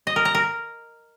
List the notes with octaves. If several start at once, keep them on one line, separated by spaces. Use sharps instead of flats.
D#5
A#4
A#5
A#4